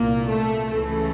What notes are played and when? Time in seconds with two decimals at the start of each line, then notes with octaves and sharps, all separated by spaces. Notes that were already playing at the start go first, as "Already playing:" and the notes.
Already playing: C2 A#2 A#3
0.27 A3
0.67 C#2 C#3 E3 A3